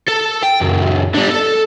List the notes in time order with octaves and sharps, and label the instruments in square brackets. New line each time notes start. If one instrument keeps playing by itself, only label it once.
[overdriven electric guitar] A4
G5
C#2 F#2
D3 G3
A4